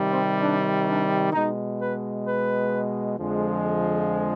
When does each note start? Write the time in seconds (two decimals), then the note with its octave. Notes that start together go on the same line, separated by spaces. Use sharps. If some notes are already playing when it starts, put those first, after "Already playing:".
Already playing: C3 D#3 G3
0.10 C4
0.41 D4
0.87 D4
1.32 B2 G#3 D#4
1.78 B4
2.25 B4
3.17 F2 D3 F3 G#3